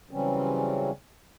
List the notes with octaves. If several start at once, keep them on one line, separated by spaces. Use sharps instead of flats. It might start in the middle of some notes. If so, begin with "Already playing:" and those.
C#3 E3 F#3 G3 C4 C#4